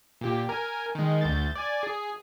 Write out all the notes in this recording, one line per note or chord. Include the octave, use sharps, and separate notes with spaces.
A#2 G4
A#4 G#5
D#3 G#3
D2 G6 A6
D5 G#5
G#4